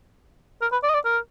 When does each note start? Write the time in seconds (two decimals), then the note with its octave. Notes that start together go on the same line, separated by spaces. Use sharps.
0.61 A#4
0.72 B4
0.83 D5
0.89 D#5
0.94 D5
1.05 A#4